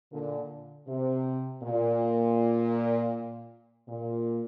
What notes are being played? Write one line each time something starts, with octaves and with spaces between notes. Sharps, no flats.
A#2 D3
C3
A#2
A#2